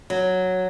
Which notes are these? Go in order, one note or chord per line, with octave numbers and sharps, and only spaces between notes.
F#3